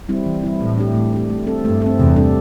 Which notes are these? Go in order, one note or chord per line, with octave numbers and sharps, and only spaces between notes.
G3 C4 E4
E3
G3 C4 E4
A2 A3
D4 G4
A3
D4 G4
A3
C4 A4
G2 A3
C4 A4
E2 C3
G3 D4 A4